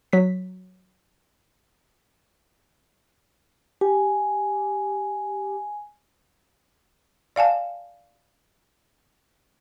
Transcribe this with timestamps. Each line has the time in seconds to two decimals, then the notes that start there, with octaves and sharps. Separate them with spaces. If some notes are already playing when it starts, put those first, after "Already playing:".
0.13 F#3 B6
3.81 G4 G#5
7.36 D5 F5 G#5 A5